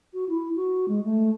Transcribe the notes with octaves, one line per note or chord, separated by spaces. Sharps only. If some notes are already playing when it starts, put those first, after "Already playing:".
F#4
E4
F#4
G#3
A3